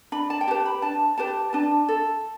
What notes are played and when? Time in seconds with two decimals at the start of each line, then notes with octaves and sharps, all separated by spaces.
0.12 D4 B5
0.30 A5
0.41 G5
0.47 G4 B4 A5
0.65 B5
0.82 D4 A5
1.18 G4 B4 A5
1.53 D4 A5
1.88 A4